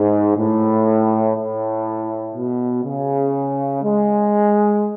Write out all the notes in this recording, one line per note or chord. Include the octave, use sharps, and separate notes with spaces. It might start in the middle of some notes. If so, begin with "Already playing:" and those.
Already playing: G#2
A2
A2
B2
C#3
G#3